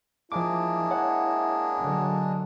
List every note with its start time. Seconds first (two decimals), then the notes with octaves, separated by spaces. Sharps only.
0.32 F3 G#3 A#3 D4 E4 D6
0.91 C#5 F#5
1.80 D3 F#3